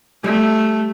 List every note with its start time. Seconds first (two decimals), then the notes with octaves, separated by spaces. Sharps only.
0.24 G3 A3